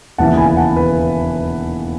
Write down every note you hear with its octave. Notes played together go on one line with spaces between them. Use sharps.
E1 D#2 C#3 E3 F#5 A5
G#5 B5
F#5 A5
B4